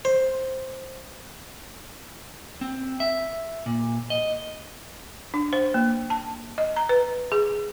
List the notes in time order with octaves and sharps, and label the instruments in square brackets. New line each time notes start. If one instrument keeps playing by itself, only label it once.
[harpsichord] C5
[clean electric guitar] C4
E5
A#2
D#5
[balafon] D4
C5
A#3
A5
D#5
A#5
B4
G#4